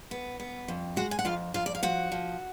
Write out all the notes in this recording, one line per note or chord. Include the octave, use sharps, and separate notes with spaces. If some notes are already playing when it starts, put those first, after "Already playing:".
B3
B3
F2
G#3 F#4 F#5
G#5
F#5
F2 F4 F5
F2 F4 F5
D5
F5
F3 F#4 F#5
F3